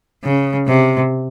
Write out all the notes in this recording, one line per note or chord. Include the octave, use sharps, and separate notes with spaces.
C#3
C3